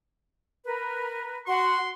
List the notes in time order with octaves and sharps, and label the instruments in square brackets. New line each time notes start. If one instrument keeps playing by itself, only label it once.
[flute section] A#4 B4
[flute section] F#4 F#5 [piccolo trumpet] C6